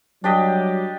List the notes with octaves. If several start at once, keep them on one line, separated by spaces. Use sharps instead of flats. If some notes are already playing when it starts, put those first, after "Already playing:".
F#3 G3 D4 G4 D#5